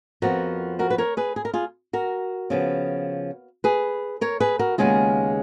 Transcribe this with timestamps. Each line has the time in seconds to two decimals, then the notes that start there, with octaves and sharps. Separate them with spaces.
0.22 F2 F3 B3 F#4 A#4
0.79 F#4 A#4
0.90 B4
0.98 A#4 C#5
1.17 G#4 B4
1.36 G#4
1.45 A#4
1.54 F4 G#4
1.93 F#4 A#4
2.50 C#3 F3 B3
3.64 G#4 B4
4.21 A#4 C#5
4.40 G#4 B4
4.59 F#4 A#4
4.78 D#2 C#3 G#3 B3 F4 G#4